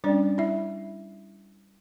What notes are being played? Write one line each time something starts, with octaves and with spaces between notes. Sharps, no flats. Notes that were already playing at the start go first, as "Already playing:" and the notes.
G3 C#4 D4 D5
E4 E5